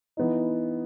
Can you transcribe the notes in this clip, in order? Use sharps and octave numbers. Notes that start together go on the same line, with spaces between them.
E3 B3 D#4